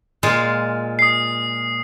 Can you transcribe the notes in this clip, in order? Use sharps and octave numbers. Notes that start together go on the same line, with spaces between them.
A#2 G#3 F4
D#6 C7